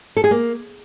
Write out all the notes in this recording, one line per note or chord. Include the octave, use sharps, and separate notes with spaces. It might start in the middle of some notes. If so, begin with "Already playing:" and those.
A4
G#4
A#3